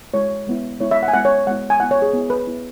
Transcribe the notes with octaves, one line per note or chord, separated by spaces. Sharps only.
G#3 E4 C#5
G#3 B3 E4
G#3 B3 E4 C#5
E5
F#5
G#5
G#3 B3 E4 F#5
C#5
G#3 B3 E4 F#5
G#5
B3 E4 F#5
C#5
G#4
B3 E4
B4
B3 E4